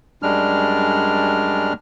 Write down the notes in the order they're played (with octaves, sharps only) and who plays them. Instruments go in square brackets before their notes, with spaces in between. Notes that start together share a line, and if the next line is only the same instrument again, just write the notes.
[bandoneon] F#2 G3 G#3 D4 F6